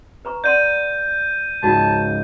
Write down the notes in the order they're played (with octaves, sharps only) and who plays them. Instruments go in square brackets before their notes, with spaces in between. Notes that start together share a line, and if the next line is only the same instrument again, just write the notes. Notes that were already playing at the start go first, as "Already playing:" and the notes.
[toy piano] B4 A#5 C#6
[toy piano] D5 F#5 C6 [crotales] G6 D#7
[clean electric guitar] C#2 G#2 [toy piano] F4 F#4 [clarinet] A5